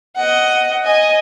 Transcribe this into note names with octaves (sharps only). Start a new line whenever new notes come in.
D#5 F#5
D#5 G#5